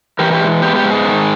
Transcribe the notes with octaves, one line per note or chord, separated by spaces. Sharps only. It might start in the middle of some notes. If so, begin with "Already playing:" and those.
E3 G4 A#4
G4
G#3
B3 G4
G4
G#2
G#4
D#3